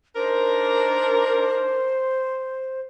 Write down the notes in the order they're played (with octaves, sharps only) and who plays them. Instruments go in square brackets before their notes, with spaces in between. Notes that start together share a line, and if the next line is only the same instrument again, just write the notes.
[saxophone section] D4 D#4 A#4 [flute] C5